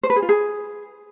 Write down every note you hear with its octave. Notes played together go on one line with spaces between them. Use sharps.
C5
B4
G#4
F4
G#4